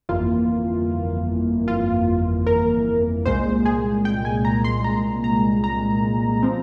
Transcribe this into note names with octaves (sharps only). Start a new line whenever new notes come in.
G1 F2 E3 A#3 F4
F4
A#4
C2 A#2 G#3 C5
G#4
G5
G#5
A#5
C6
A#5
A#5
A#5
F3 C4